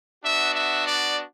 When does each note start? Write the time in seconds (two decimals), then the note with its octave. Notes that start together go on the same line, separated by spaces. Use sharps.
0.24 B3 D4 F#4 E5
0.55 E5
0.86 D5